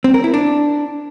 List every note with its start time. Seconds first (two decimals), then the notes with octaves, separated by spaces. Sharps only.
0.04 C4
0.14 A#4
0.24 E4
0.34 D4